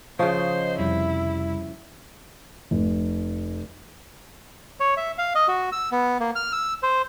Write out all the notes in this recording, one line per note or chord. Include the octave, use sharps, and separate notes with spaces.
C#3 F3 C5 C#5 D#5
F2 C3 G3 E4
F1
C#5
E5
F5
D#5
F#4
E6
B3
A#3
F6
E6
C5